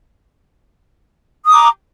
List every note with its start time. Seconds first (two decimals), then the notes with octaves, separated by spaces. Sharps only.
1.45 D#6
1.50 D6
1.54 A#5